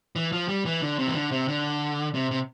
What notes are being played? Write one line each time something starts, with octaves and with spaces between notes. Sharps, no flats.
E3
F3
G3
E3
D3
C3
E3
D3
C3
D3
C3
C3